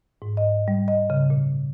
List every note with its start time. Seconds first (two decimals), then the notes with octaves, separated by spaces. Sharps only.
0.22 G#2
0.37 D#5
0.68 G3
0.88 D#5
1.10 C#3
1.30 A#2